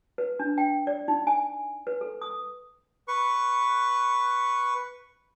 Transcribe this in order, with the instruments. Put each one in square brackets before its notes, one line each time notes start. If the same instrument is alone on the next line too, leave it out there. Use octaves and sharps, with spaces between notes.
[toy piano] B4
D4
G5
D5
D#4
G#5
B4
A4
D#6
[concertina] B4 C#6